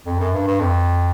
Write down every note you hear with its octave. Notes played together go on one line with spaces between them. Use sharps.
F2
F#2
G2
G2
F2